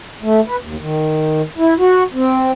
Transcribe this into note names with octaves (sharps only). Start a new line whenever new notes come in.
A3
B4
D#2
D#3
E4
F#4
C4